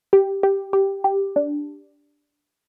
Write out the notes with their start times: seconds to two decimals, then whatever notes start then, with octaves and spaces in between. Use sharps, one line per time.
0.13 G4
0.43 G4
0.73 G4
1.04 G4
1.36 D4